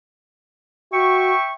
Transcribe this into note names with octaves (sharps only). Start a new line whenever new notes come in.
F#4 E5 G5 C#6